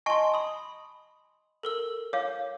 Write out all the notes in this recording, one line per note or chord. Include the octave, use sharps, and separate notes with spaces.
D#5 G#5 A5 C6 C#6
B5 D#6
A4 A#4 E6
C#5 F5 D6